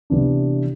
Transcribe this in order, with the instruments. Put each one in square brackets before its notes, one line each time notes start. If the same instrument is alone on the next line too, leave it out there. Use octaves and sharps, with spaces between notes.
[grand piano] C3 E3 B3 D4